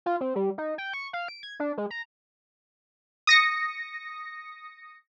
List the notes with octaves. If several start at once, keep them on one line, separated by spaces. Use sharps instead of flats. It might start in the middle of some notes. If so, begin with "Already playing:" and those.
F4
C4
G3
D#4
G5
C#6
F5
D7
G#6
D4
G#3
A#5
D#6 A#6 C#7